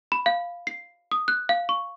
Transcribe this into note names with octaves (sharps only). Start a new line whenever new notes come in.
B5
F5
C7
D#6
F#6
F5
C#6